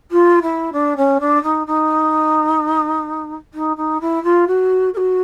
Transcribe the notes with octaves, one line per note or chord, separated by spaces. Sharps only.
F4
E4
D4
C#4
D4
D#4
D#4
D#4
D#4
E4
F4
F#4
A#4
F#4